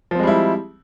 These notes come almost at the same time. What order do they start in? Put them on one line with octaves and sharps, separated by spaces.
F3 C4 G#3 G3 E4